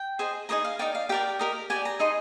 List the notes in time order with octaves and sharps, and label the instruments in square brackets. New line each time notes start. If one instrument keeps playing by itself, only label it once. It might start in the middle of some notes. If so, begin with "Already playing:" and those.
Already playing: [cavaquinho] G5
G#4 C5 D#5
D#4 G#4 C5 D#5 A#5
F5
D#4 A#4 D5 G5
F5
G4 A#4 D5 G5
G4 A#4 D#5
G4 D5 G#5
A#5
D#4 G#4 D#5 C6